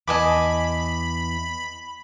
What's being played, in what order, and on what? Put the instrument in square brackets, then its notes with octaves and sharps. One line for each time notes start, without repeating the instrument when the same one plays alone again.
[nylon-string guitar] E2 A5 [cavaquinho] D#5 G#5 D6 [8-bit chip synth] B5